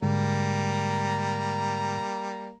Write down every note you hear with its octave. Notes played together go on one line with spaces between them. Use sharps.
G#2 D3 G3 G#3 A#3 A#5